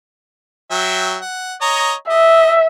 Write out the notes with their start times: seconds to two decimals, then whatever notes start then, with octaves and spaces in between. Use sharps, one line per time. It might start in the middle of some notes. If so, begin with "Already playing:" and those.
0.71 F#3 E5 G5
1.22 F#5
1.61 C#5 D#5 A#5
2.10 D#5 E5